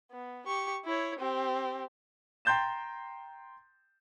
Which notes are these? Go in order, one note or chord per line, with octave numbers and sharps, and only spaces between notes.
B3
G4 C#6
E4 C#5
C4 G4
G5 A#5 C6 G6 A6 E7